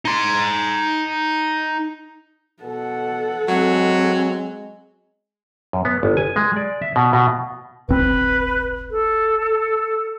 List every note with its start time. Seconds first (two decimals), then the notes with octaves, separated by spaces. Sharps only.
0.05 D#4 C6
2.63 B2 A4 F#5
3.48 F#3 G#3 C4
5.73 F#2
5.85 B3
6.03 G1
6.17 G#5
6.36 G#3
6.56 D5
6.82 E5
6.96 B2
7.13 B2
7.89 D1 G1 C4 B4
8.90 A4